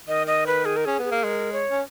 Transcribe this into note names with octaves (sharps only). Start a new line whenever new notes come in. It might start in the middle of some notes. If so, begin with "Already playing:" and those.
D#3 D#5
D#5
B4
G#4
A#4
C#4 G#4
B3
G#4
A#3
G#3 A#4
C#5
C#4